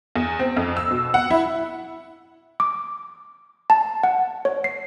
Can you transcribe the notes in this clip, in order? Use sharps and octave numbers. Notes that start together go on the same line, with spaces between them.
E2
C4
F2
E6
B2
F#5
E4
D6
A5
F#5
C#5
C7